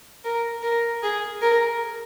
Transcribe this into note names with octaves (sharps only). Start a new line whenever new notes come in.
A#4
A#4
G#4
A#4